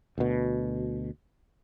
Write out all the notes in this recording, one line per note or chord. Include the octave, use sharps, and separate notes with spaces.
D2 B2